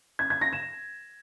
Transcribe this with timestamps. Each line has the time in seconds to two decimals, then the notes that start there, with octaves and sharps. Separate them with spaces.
0.19 G#6
0.30 G#6
0.41 A#6
0.53 E7